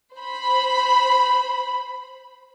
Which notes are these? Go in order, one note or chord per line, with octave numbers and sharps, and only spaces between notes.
C5 B5